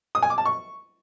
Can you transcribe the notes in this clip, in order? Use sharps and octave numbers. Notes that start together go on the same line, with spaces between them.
D#6
G#5
D6
A5
C#6